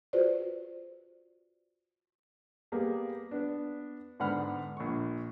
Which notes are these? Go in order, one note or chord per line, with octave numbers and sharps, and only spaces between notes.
F4 F#4 G#4 B4 C5 D5
G3 A#3 B3 G#4
B3 D4
G#2 D3 B3 F#5 B5 F6
A#1 C#6